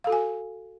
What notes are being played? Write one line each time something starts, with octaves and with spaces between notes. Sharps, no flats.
F#4 A4 F5 G#5